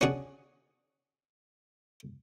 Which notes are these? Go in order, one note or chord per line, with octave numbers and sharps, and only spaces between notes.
C#4 D4 F#4 G#4